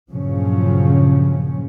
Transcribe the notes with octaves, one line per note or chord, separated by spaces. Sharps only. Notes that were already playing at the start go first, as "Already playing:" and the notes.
G2 A#2 C#3 F3 F#3 C#4